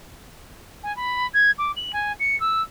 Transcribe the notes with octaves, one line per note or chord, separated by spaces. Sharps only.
G#5
B5
G#6
D6
F#7
G#5
C#7
E6